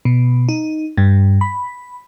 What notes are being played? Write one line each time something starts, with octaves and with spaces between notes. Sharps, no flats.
B2
D#4
G2
B5